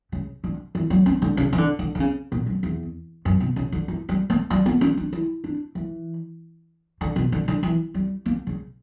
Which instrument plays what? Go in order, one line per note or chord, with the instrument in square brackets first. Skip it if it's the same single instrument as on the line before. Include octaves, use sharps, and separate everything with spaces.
[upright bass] C#3
D3
E3
F#3
C#4
D3
C#3
E3
D3
D3
D3
C#3
A#2
F#2
E2
F#2
B2
C#3
D3
E3
G3
A#3
G3
B3
C#4
D4
E4
D4
E3
D3
B2
D3
D3
E3
G3
A#3
C#3